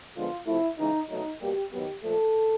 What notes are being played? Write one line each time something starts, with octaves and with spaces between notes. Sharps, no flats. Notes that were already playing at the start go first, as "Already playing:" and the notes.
D3 F3 G#3 B3 F4
C3 F3 A3 E4
C#3 E3 G#3 D#4
B2 F#3 A3 D#4
B2 G3 A#3 G4
D#3 F#3 B3 G4
A#2 F3 A3 A4